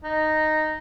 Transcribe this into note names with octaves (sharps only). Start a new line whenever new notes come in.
D#4